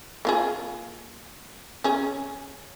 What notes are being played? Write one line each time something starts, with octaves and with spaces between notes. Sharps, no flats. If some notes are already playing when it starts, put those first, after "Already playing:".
A#3 F4 G#4
C#4 G#4